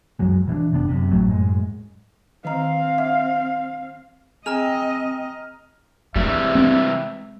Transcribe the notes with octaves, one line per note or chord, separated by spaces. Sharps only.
C2 F#2 F#3 G#3
B2 E3 C#4 D4
F#1 C3 B3 D4
F#2 C3
G#1 A2 F#3 A3
F#2 A2 D3 G#3
D#3 C4 D#5 F5 A#5
E5 F#5
C4 G#4 D#5 A#5 F6 F7
C3 E3 G3 G#3 E5
C4